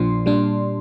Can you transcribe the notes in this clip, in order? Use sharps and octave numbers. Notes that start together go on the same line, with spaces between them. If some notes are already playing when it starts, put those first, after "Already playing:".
Already playing: A#1 A#2 F3 D4 C6
A#2 G3 D4